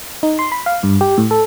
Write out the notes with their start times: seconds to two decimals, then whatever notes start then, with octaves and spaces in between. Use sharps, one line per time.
0.23 D#4
0.39 C6
0.52 B5
0.66 F5
0.83 G2
1.01 G4
1.18 A2
1.31 A4